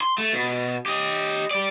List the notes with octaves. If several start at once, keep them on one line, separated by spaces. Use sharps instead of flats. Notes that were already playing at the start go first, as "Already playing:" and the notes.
C6
A3
B2
G4 D#5
G4 D5